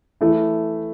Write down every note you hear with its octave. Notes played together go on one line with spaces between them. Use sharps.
E3 A3 E4